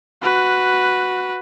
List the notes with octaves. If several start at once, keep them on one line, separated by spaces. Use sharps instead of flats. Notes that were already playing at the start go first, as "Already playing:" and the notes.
F#4 B4